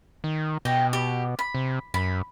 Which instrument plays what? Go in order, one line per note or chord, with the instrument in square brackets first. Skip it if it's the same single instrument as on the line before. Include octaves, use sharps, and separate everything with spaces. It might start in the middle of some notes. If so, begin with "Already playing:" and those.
[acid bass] D#3
[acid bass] B2 [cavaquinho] G4 D#5 G5
[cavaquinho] G4
B5
[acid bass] C3
[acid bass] F#2 [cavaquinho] B5